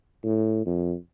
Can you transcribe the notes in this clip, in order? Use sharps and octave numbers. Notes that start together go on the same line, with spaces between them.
A2
F2